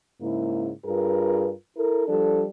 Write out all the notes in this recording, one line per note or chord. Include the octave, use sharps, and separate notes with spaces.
G#2 C#3 A#3 E4
G2 F4 G#4 A#4 B4
E4 A4 A#4
F3 G3 D4 A4